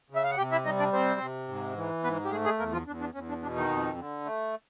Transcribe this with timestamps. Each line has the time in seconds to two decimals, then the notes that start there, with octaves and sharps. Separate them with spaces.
0.10 C#3
0.16 E5
0.24 F5
0.31 F#5
0.37 C3 G4 G5
0.52 E4 E5
0.65 G3 D#4 D#5
0.79 D4 D5
0.93 C3 C4 C5
1.21 C3
1.48 G#2
1.76 E3
2.04 G#2 B3 B4
2.25 G4
2.31 G#3 A3 G#4
2.45 G#3 G#4
2.59 E2 A#3 A#4
2.73 F3 F4
2.87 E2 D4
3.00 D4
3.14 E2 C#4
3.29 D4
3.42 B2 D4
3.56 D#3 D#4
3.70 F2
3.98 D3
4.25 A3